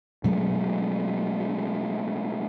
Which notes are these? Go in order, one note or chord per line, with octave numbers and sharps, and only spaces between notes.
B2 F#3 G#3 A3